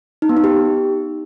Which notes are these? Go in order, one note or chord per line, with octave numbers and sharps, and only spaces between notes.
D#4
B3
D#4
G4